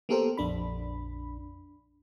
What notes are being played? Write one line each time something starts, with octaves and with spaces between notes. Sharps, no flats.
A#3 B3 G4 A4 A#4 C5
A#1 F2 D4 B5